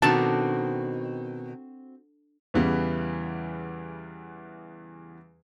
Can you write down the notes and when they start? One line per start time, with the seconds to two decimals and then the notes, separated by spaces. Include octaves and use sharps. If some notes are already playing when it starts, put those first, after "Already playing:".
0.02 B2 D#3 C4 D4 F#4 A4 A5
2.54 E2 C#3 E3 G3 B3